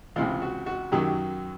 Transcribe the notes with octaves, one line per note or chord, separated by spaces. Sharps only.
C#2 C3 E3 F4
F#4
F#4
F#2 D#3 F#3 G4